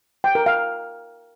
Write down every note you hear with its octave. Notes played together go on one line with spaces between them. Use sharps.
G5
A#4
F5